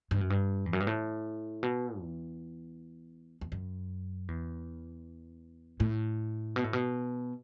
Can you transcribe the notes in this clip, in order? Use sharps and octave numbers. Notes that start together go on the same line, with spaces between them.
G2
F#2
G2
E2
F#2
G2
A2
B2
E2
E2
F#2
E2
A2
B2
A2
B2